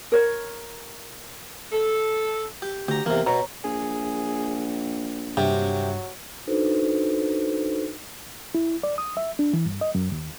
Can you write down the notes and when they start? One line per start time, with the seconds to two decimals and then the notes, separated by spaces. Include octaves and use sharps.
0.12 A#4 C#5
1.72 A4
2.62 G4
2.88 D2 G4 A#5
3.06 E2 C3 A#3
3.26 B2 C#5 A#5
3.64 A#1 G#4
5.37 G2 C3 F#3
6.47 D4 D#4 F#4 A4 B4 C5
8.55 E4
8.83 D5
8.98 D#6
9.17 E5
9.39 D4
9.53 E3
9.66 G2
9.81 D#5
9.95 F#2
10.12 D#2